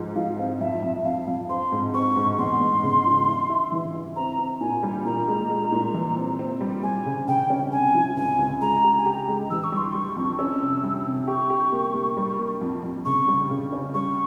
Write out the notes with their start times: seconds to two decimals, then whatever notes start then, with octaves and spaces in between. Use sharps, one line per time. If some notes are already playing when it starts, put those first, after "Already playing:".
Already playing: G#2 F3
0.16 F3 F5
0.38 C4
0.61 F2 E5
0.83 F2
1.04 F2 F5
1.27 F2
1.49 C4 C6
1.72 G#2
1.94 C4 C#6
2.16 G#2
2.38 E2 C6
2.61 E2
2.83 C#3
3.05 F3
3.28 E4
3.49 E4
3.72 E3
3.94 E4
4.16 C4 A#5
4.39 C4
4.61 A#2 G#5
4.83 G3
5.05 A#2 A#5
5.28 G#3
5.49 G#3
5.72 A#2
5.94 E3
6.16 C4
6.39 C4
6.61 G3
6.83 G3 G#5
7.06 C#3
7.28 C#3 G5
7.50 C#4
7.72 C3 G#5
7.95 F3
8.16 C#2 G#5
8.39 C#2
8.61 G#3 A#5
8.84 G4
8.98 G#5
9.06 G4 A#5
9.28 G#3
9.50 E3 E6
9.64 C#6
9.72 G3
9.78 C6
9.92 G3 C#6
10.17 F2
10.38 C#4 E6
10.61 C3
10.83 G3
11.06 C3
11.28 G4 C#6
11.50 G4
11.72 A#3
11.94 A#3
12.17 G3
12.39 A#3
12.61 F2
12.83 F2
13.05 C#3 C#6
13.28 G3
13.50 C#3
13.72 C#4
13.94 G3 C#6